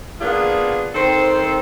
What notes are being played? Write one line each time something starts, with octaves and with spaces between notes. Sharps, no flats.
A#3 B3 D4 F4 G#4
D#3 C4 A4 C5